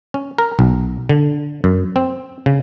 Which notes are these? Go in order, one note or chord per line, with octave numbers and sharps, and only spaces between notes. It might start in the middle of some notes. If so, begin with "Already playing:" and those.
C#4
A#4
B1
D3
F#2
C4
C#3